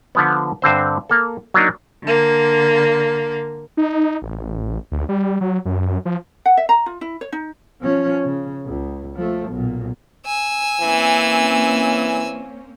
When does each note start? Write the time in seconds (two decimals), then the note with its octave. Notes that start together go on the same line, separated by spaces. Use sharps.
0.15 D3 F3 B3
0.62 G2 D3 C4 C5
1.10 A#3 A4
1.54 F#3 A#3 D4 D#4
2.03 D3 A#3
3.77 D#4
4.22 A1
4.92 D2
5.09 G3
5.41 F#3
5.65 F#2
6.05 F3
6.46 F#5
6.57 E5
6.69 A#5
6.86 F4
7.01 E4
7.21 C#5
7.32 D#4
7.81 F3 C#4
8.24 C#3
8.66 C#2
9.16 F3 A3
9.49 B1 A#2
10.26 G#5 E6
10.80 E3 A#3 C4 C#4